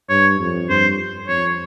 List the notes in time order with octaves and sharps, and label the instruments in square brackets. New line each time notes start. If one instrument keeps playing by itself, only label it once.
[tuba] G2 [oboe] C#5
[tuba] F2
[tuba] G2 [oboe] C5
[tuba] F2 [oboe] C#5